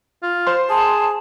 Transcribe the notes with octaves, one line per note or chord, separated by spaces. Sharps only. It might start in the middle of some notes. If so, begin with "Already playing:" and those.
F4
C5 C6
G#4 A5